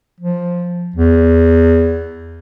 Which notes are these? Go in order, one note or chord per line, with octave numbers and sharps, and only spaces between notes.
F3
E2